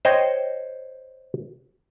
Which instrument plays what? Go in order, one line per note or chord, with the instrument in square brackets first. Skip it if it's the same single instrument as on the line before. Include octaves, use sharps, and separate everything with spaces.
[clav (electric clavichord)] C5 C#5 D#5 G5